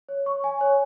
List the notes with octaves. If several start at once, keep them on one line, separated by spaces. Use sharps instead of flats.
C#5
C#6
G#5
C#5